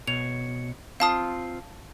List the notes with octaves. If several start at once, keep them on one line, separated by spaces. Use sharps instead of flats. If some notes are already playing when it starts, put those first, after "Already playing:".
B2 C#5 F7
C4 F4 F5 A5 D#6